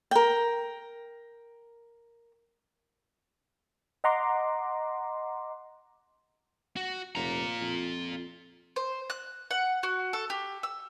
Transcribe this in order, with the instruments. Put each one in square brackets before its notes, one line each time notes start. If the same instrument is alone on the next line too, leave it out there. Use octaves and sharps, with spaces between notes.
[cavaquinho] A#4 G5
[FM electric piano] D#5 F#5 A#5 C6 D6
[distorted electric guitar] F#4
[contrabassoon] F1 [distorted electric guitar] F4 A#5
[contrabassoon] F2
[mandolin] C5
F#6
F#5
F#4
A4
G4
E6